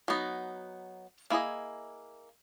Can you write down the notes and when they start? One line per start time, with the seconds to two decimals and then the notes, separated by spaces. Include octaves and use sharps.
0.08 F#3 B3 D#4
1.30 A#3 E4 G#4 D#5